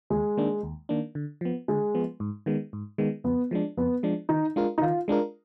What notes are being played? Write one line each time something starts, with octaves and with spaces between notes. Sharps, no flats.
D#2 G#3
D#3 A#3 D4
D#2
D#3 A#3 D4
D3
F3 B3
D3 G#3
F3 B3
G#2
D#3 G#3 B3
G#2
D#3 G#3 B3
F2 B3
F3 G#3 D4
F2 B3
F3 G#3 D4
D#3 D#4
G#3 D4 F4 A#4
D#4
D#3 F4
G#3 D4 F4 A#4